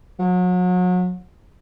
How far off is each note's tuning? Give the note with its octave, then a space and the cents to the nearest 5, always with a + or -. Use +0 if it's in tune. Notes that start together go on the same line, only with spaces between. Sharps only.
F#3 -35